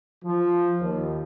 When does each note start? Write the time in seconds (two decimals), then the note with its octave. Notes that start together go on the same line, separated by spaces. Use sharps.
0.24 F3
0.81 D#2